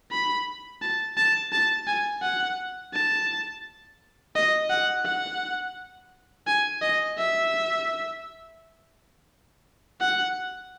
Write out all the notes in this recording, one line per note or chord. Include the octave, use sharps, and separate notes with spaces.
B5
A5
A5
A5
G#5
F#5
A5
D#5
F#5
F#5
G#5
D#5
E5
F#5